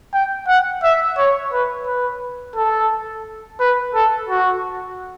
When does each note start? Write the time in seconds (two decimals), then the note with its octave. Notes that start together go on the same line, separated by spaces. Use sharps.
0.14 G5
0.47 F#5
0.83 E5
1.18 C#5
1.52 B4
1.86 B4
2.56 A4
3.60 B4
3.95 A4
4.29 F#4